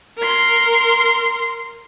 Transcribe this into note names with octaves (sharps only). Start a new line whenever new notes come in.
A#4 C6